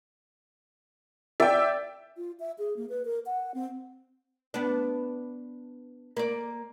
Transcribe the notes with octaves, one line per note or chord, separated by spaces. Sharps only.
D5 E5 G5
F4
E5
G#4
A#3
B4
A#4
F#5
C4
B3 D4
A#3 D5